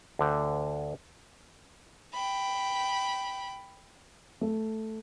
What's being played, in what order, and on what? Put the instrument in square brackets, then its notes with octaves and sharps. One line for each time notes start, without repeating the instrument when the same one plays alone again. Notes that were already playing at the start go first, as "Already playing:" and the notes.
[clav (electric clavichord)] D2 D3 G5
[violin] G5 B5
[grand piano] A3